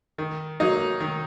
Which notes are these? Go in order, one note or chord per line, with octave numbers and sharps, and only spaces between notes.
D#3
F#3 A#3 D#4
D#3